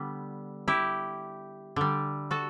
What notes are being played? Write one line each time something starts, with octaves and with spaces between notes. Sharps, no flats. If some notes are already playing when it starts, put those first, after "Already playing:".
Already playing: D3 G3 B3
E4 G4
D3 G3
F#4 A4